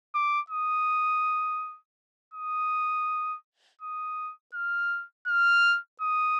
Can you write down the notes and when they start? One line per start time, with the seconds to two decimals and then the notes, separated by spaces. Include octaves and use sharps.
0.15 D6
0.50 D#6
2.34 D#6
3.81 D#6
4.54 F6
5.27 F6
6.01 D#6